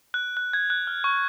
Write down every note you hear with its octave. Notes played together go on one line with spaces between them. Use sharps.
F#6
F#6
G#6
F#6
F6
C#6